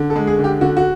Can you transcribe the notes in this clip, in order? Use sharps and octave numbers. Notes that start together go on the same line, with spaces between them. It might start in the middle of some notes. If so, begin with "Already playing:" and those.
Already playing: D3
A4
G#3
G#4
D3
G4
D3 F#4
F#4